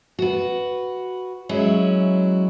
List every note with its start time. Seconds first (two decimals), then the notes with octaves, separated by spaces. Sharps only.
0.19 F#4 B4
1.49 F#3 G#3 C#4 E4